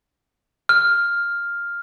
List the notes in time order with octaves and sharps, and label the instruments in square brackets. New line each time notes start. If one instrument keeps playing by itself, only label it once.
[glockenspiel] F6